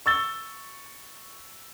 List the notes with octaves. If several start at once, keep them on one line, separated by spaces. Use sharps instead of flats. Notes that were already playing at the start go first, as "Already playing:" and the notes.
C#6 E6 A6 G7